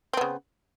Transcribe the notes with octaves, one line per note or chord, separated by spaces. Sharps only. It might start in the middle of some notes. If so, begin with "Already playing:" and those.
C#3 B3 C4